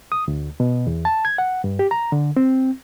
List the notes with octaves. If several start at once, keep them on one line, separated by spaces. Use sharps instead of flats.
D#6
D2
B2
E2
A5
G#6
F#5
G2
G4
A#5
D3
C4